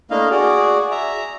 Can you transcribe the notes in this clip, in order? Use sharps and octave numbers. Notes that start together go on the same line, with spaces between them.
A3 A#3 D4 E4 D#5 F5
F#4 G#4 D5
E5 A#5